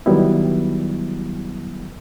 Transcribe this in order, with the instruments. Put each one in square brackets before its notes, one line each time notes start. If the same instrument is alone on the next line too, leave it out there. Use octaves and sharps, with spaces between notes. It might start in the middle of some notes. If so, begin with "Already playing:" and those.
[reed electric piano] D#3 F#3 G3 B3 E4